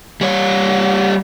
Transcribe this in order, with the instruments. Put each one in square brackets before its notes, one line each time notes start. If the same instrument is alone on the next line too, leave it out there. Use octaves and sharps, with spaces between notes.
[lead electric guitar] G3 C#5